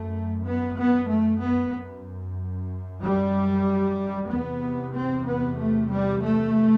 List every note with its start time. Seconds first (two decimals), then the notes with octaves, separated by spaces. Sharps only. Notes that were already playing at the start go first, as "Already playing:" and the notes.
Already playing: F#2 A3
0.44 B3
0.77 B3
1.08 A3
1.41 B3
1.72 F#2
3.02 G3
4.29 E2 C3 B3
4.94 C4
5.25 B3
5.58 A3
5.90 G3
6.21 A3